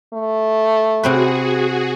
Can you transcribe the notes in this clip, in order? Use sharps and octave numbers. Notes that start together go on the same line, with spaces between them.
A3
C3 C4 F#4 G#4 B4